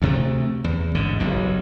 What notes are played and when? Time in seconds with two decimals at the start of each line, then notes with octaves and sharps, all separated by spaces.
0.02 D2 C3 A3
0.64 E2
0.95 A1 G#2 D3
1.19 F#1 B1 G2